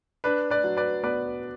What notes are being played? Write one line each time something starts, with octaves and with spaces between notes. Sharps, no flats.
D4 B4
B4 D5
F#3
B4 D5
B3 B4 D5